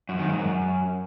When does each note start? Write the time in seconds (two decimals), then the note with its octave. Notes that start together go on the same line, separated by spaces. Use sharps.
0.09 F#2
0.19 D#3
0.29 G#2
0.39 F#2